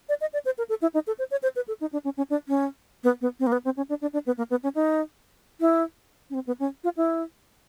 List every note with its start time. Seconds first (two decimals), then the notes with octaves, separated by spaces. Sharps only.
0.09 D5
0.21 D#5
0.33 D5
0.45 C5
0.58 A#4
0.69 A4
0.82 E4
0.94 D#4
1.07 A4
1.19 C5
1.31 C#5
1.43 C5
1.56 B4
1.68 A4
1.81 D#4
1.93 D4
2.04 C#4
2.17 C#4
2.30 D4
2.48 C#4
3.04 B3
3.21 B3
3.40 C4
3.47 A#3
3.52 B3
3.65 C4
3.77 C#4
3.89 D4
4.01 D4
4.13 D4
4.26 B3
4.38 A#3
4.50 B3
4.63 C#4
4.75 D#4
5.60 E4
6.30 C#4
6.34 C4
6.47 B3
6.60 C#4
6.84 F4
6.97 E4